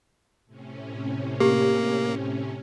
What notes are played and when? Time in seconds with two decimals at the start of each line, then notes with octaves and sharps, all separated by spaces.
0.46 A2 C3 C#4
1.40 A#3 G4